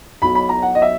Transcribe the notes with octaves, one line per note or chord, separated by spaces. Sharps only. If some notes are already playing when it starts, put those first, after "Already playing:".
B1 B2 F#3 B5
B5
A#5
F#5
D#5
E5